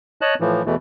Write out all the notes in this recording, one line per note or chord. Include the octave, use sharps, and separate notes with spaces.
C#5 D#5 A5 F#6
A2 E3 F3
E2 B2 E3 A3